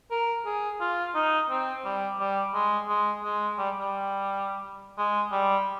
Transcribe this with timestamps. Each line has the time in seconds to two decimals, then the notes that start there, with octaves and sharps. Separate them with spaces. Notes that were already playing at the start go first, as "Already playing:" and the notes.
0.11 A#4
0.45 G#4
0.80 F4
1.15 D#4
1.50 C4
1.85 G3
2.19 G3
2.54 G#3
2.88 G#3
3.24 G#3
3.58 G3
3.80 G3
4.98 G#3
5.32 G3